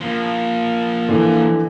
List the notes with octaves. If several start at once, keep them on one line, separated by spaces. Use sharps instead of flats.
F3 A#3
D3 E3